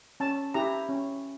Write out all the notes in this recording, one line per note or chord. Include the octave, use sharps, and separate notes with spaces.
C#4 A5
E4 G4 A#5
C#4